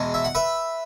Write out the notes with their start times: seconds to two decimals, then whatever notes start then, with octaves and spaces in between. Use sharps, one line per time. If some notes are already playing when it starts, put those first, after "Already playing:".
Already playing: E2 B2 G#3
0.14 E5
0.24 F#5
0.35 B4 E5